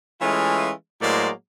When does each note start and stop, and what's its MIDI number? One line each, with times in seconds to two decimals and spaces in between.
0.21 0.71 52
0.21 0.71 56
0.21 0.71 57
0.21 0.71 61
0.21 0.71 65
1.01 1.30 45
1.01 1.30 54
1.01 1.30 56
1.01 1.30 58
1.01 1.30 72
1.01 1.30 74